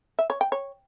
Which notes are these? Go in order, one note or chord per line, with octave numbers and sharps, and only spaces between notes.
E5
C#5
G5
C#5